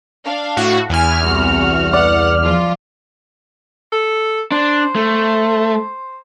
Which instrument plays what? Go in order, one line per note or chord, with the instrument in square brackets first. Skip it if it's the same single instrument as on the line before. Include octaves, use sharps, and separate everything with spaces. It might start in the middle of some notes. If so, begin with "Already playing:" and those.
[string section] D4 F5
[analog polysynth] A2 F#4
[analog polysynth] E2 F6 [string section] E4 G#5
[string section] C2 F#4
[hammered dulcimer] D5 [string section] F#5
[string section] F3 F4
[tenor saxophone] A4
[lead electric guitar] D4 [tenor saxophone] C5
[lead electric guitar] A3